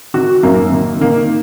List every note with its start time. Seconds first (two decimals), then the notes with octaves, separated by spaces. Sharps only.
0.14 D#3 F#4
0.43 F#2 A#3
0.72 D#3
1.01 D#3 A#3